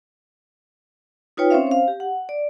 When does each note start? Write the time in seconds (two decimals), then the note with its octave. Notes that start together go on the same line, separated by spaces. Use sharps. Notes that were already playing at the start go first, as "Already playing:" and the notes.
1.37 D#4 F4 B4 C#5 G5
1.51 C4 C#4 C5 C#5 E5 F5
1.67 C5 F5
1.88 G4
2.00 F#5
2.29 D5